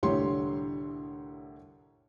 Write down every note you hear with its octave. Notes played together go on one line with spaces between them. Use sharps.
C2 A2 D3 G4 C#5 C6